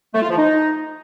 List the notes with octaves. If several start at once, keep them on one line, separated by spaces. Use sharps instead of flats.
A3
F4
F3
D#4